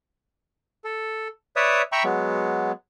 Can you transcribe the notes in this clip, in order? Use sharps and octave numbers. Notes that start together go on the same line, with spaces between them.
A4
B4 C#5 D5 E5 D#6
E5 G5 A#5 B5 C#6
F#3 G#3 B3